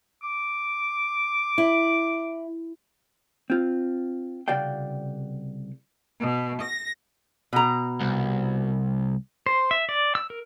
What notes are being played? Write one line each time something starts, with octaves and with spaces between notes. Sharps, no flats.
D6
E4
C4 F4
C2 C#3 F#4 D5 F5 G5
B2
A#6
B2 A#5
C2
C5
E5
D5
E6
A#4